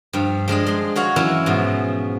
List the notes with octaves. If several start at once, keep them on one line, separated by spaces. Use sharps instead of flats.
G2 F3
F3 G#3 D4 D#5
G#3 C6
F#4 C#5 F5 F#5
E3 F#3 C#4 E4 F5 F#5
G#2 B2 F3